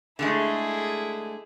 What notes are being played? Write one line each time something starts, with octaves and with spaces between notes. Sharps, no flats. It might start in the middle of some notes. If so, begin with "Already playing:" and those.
D3 G#3 A3 E4 G#4